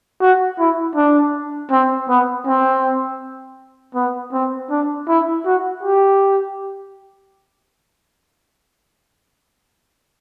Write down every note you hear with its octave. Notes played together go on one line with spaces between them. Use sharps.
F#4
E4
D4
C4
B3
C4
B3
C4
D4
E4
F#4
G4